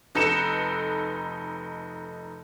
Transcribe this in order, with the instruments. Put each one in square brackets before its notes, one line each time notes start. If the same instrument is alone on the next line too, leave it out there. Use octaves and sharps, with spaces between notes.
[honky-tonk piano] F1 D#4 A4 B4 C#7 E7